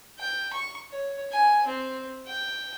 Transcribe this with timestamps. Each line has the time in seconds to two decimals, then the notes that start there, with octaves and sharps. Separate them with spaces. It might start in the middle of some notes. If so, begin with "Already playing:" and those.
0.19 G5
0.53 C#6
0.91 C#5
1.32 G#5
1.67 C4
2.27 G5